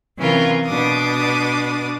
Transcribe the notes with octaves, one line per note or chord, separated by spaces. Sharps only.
C3 E3 C#4 F4 A#4
B2 D4 D6 D#6